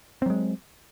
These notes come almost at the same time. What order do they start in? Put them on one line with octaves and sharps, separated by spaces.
C4 F#3 G#3